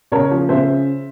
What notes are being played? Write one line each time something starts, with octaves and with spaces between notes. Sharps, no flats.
C#3 A#4 C#5
F3
C#3 C5 E5